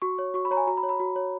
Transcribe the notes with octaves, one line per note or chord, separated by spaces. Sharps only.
F#4 C#6
C#5
F#4 C#6
B5
C#5 A#5
G#5
F#4 A#5
B5
C#5
B5
F#4
C#5